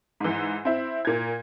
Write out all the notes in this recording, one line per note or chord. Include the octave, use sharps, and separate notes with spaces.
G#2 E3
C4 E4
A#2 G#6